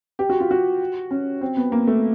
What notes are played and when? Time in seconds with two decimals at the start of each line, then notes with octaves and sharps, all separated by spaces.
0.19 G4
0.30 F#4
0.40 F4
0.51 F#4
1.11 C#4
1.41 C4
1.57 B3
1.72 A#3
1.87 A3